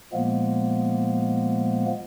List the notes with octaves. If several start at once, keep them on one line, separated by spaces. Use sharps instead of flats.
A#2 F3 G#3 A#3 B3